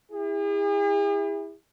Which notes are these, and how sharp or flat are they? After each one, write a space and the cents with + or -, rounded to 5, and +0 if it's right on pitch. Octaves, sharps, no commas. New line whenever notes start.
E4 -10 G#4 -45